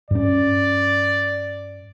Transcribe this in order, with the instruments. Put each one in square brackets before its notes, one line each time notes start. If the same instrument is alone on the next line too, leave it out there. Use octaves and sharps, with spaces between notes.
[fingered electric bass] G2 C#4 [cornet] D5